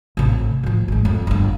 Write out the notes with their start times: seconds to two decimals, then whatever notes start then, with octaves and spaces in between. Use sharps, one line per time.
0.17 A1 C3
0.63 A2 F3
0.88 A1 G#3
1.05 F2
1.27 G1 F2